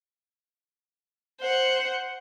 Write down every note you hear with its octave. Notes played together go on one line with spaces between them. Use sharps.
C5 F#5